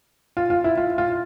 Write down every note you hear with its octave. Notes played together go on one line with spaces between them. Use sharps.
F4
F4
E4
F4
F4